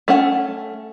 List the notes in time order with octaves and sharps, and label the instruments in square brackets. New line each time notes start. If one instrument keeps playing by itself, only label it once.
[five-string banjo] A3 C#4 F#5